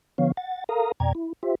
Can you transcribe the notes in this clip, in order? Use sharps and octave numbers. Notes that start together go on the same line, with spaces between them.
D3 F3 B3 C#5 F5
F#5 A6
A4 A#4 F5 A#5 D#6
F2 B2 D5 G5 A#5 G#6
E4
F4 G4 C5 E5